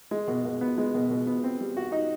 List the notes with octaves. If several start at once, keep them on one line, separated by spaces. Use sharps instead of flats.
G#3
B2
B2
B3
G#3
B2
B2
B3
C4
G3
F#4
D#4